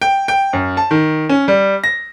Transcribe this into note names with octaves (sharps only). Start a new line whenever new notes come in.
G5
G5
F#2
A5
D#3
C#4
G3
A#6